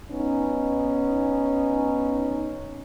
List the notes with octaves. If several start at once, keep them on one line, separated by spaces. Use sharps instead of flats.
B3 C#4 D#4